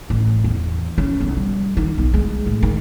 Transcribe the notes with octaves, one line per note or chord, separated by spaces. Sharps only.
A1
E2
C#4
B1
G3
D#3
B1
G#3
A2
D#3